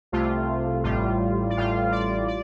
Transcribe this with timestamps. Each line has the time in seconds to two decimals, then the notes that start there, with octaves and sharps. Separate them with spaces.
0.12 C2 C3 A3 F4
0.84 A1 A2 G3 F4
1.50 D5
1.56 A1 A2 G3 F4 F5
1.92 D5
2.28 D5